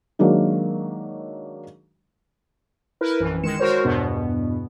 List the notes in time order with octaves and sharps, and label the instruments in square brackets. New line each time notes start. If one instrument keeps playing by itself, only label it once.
[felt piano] D#3 F#3 G#3 A#3 D4
[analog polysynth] E4 A#4 B4
A#1 F#2 E3
D#3 G#3 C#7 E7
G#3 F#4 A#4 C5 C#5
E2 G2 B2 B3